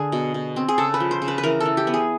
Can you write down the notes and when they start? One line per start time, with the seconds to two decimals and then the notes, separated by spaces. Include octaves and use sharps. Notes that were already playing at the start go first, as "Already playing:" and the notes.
Already playing: D3 G#4
0.12 B2
0.34 B2
0.56 C4
0.68 G#4
0.78 C#3 A4
0.94 B4
1.00 F3
1.11 C5
1.22 C#3
1.28 B4
1.38 B4
1.43 E3 A#4
1.60 A4
1.66 E3
1.77 G4
1.87 B3
1.94 G#4